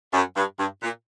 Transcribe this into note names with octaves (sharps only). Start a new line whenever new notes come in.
F#2
G2
G2
A#2